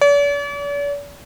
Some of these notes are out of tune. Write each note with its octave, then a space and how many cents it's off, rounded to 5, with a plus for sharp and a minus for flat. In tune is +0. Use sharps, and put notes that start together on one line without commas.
D5 -45